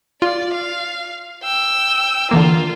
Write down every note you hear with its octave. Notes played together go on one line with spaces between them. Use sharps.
F4 D5
F5
G5 E6
D3 E3 A#3 F4 A#4